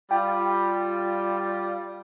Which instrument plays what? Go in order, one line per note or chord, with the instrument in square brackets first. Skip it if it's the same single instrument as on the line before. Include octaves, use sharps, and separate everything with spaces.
[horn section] G3 F4 [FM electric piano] G5